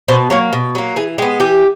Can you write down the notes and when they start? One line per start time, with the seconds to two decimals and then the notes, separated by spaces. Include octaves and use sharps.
0.08 B2 C5
0.30 F#3 A#3 C#5
0.53 B2
0.75 F#3 A#3
0.96 E3 G#4
1.18 G#3 G4
1.22 B3
1.40 E3 G4